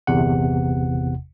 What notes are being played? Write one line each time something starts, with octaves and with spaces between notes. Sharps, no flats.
G1 E2 C3 F#5